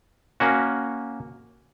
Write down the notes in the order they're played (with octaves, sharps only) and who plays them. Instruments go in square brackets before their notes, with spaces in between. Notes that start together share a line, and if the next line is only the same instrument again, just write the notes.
[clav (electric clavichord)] A#3 C#4 F#4